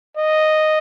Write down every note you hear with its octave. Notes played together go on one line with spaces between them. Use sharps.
D#5